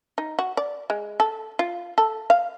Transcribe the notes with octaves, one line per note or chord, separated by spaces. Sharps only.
D#4
F#4
D5
G#3
A4
F4
A4
F5